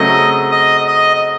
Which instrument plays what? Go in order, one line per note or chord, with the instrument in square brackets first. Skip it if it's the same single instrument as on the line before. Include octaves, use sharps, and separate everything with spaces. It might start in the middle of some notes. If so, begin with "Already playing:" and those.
Already playing: [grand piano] C#3 F#3 A3 C4 [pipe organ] D#5
[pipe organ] D#5
D#5